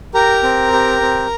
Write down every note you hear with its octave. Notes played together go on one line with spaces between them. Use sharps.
G4 A#4 A#5
C4
G4
C4